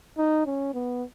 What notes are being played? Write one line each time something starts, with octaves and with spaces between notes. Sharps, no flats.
D#4
C#4
B3